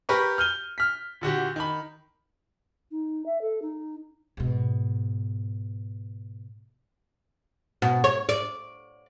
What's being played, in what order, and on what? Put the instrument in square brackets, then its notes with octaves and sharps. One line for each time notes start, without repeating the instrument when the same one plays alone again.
[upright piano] G4 A#4 B4 C#6
F6 G6 D#7 G7
F6 B6
A#2 D3 F#4 G4
D#3 B5
[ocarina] D#4
E5
A4
D#4
[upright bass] G#2 B2
[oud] B2
C#5
D5